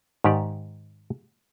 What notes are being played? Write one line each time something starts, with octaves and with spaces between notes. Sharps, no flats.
G#2 D#3 G4 D5